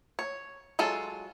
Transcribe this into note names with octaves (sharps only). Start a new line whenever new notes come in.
C#5
F#3 G#3 F4 A4